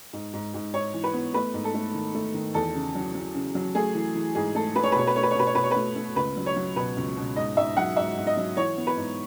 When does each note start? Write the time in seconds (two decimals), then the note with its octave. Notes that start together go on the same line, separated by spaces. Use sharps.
0.13 G#2
0.33 G#2
0.54 G#2
0.73 G#2 C#5
0.94 E3
1.04 B4
1.14 B3
1.34 A3 B4
1.54 G#2
1.64 A4
1.74 A3
1.94 D#3
2.14 A3
2.34 D#3
2.54 E2 A4
2.75 C#3
2.95 F#3
3.15 F#3
3.35 C#3
3.55 F#3
3.75 A3 G#4
3.95 E3
4.15 E3
4.35 G#2 G#4
4.55 A3 A4
4.76 A3 B4
4.83 C#5
4.92 B4
4.95 B2 C#5
5.07 B4
5.16 A3 C#5
5.23 B4
5.31 C#5
5.35 B2 B4
5.47 C#5
5.55 B2 B4
5.63 C#5
5.71 A3 B4
5.96 A3
6.16 C#2 B4
6.37 F#3
6.46 C#5
6.56 F#3
6.76 B2 B4
6.97 C#2
7.17 B2
7.36 G#2 D#5
7.57 G#2 E5
7.77 F#3 F#5
7.96 G#2 E5
8.17 G#2
8.27 D#5
8.37 F#3
8.57 E3 C#5
8.77 B3
8.87 B4
8.97 G#2